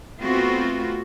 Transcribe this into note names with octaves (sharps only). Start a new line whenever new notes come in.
A3 B3 C4 F4 F#4